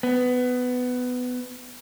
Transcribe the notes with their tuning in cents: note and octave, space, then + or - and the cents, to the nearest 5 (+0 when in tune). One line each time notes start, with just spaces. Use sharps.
B3 +15